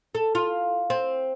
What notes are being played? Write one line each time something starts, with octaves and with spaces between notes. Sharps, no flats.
A4
F4
C4